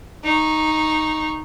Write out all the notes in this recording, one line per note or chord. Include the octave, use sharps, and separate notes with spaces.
D#4 C#6